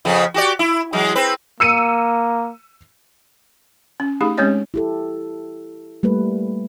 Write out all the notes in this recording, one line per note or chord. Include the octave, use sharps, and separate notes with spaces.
F2 C#3 B3
F#4 G4 D5
E4
E3 F#3 G#3
C4 B4
A#3 E6 C#7 D#7
C#4
A3 D#4 G4 G#4
G#3 C4 C#4 G4 C#5 D#5
E4 G4 A4
G3 A3 A#3 B4